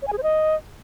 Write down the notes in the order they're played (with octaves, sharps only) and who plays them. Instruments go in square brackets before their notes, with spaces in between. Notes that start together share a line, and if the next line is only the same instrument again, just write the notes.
[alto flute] C#5
G#5
G#4
C5
D#5